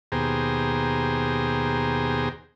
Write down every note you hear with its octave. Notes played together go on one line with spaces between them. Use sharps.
D#2 B2 G4 G#4 C5 A#5